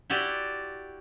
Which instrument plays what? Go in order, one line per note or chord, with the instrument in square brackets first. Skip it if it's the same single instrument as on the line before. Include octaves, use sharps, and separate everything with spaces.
[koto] E4 F#4 G4 D5